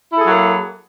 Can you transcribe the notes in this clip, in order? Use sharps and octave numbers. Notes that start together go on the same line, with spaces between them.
F#3 A#3 E4 G#4 A4